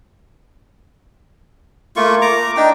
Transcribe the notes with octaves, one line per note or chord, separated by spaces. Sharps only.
A3 A#3 F4 C#6
A#5 D6
D4 D#4 G5